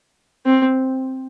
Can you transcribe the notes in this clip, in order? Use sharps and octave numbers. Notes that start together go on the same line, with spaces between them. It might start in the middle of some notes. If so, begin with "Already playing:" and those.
C4